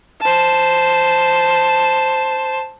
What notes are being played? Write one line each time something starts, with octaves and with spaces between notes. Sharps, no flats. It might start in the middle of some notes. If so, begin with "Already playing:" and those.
C5 A5